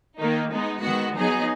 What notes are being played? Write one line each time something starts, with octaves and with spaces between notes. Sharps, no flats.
D#3 A#3 D#4
G#3 B3 D#4
D#3 G#3 B3 F#4
F#3 B3 D#4 G#4